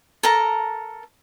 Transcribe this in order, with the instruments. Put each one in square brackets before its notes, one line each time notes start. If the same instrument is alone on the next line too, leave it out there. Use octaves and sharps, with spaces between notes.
[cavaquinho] A4 A#4 A5 A#5